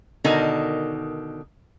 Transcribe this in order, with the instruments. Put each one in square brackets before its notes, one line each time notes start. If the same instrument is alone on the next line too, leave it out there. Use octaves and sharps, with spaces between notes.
[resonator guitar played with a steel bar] B2 D3 D#3 D#4 A#4 G#5